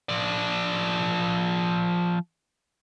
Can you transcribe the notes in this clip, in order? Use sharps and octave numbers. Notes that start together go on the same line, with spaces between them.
F3 D5